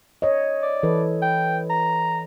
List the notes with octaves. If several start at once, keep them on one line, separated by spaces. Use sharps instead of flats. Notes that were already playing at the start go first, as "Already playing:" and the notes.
C#5 D#5
D5
E3 A4 B4
G5
A#5